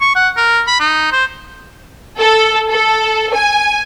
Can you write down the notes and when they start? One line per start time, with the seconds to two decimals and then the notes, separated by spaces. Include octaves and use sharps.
0.01 C#6
0.15 F#5
0.37 A#4
0.67 B5
0.80 D#4
1.12 C5
2.19 A4
2.69 A4
3.32 G#5